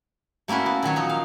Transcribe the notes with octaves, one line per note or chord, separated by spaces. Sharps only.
A3 A#3 C#4 E4 F#4
B3
A#2 D#3 F#3 C#5
F3 F#3 D#4
F5